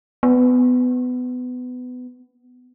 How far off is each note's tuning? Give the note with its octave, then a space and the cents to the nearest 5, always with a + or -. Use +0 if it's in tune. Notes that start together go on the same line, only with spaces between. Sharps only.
B3 +20